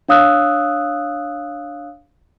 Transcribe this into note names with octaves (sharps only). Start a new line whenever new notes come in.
D4 C#5 F5 D#6 E6 F#6